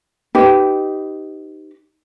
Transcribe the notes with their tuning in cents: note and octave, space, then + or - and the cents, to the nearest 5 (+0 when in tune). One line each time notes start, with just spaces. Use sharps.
D#4 +0 G4 -15 B4 +20